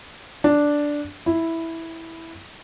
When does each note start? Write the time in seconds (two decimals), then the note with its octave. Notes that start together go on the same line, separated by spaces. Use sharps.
0.44 D4
1.26 E4